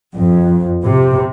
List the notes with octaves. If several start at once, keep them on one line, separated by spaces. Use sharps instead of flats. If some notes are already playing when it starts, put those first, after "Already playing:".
F2
C3